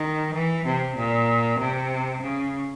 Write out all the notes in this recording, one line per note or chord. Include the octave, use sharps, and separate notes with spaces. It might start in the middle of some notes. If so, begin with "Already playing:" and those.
Already playing: D#3
E3
C3
A#2
C3
C#3